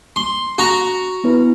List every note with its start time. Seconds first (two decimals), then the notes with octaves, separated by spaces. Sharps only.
0.16 C6
0.58 F#4 A#5
1.24 B3 E4 B4